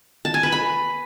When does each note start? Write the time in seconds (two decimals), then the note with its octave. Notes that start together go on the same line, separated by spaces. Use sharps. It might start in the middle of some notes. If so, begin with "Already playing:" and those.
0.25 A5
0.34 G#5
0.43 B4
0.52 B5